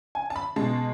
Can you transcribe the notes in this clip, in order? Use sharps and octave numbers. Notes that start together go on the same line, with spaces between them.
G#5
A5
B5
B2 G#3 A5